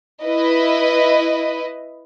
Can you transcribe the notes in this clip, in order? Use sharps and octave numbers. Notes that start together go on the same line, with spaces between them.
E4 B4 D#5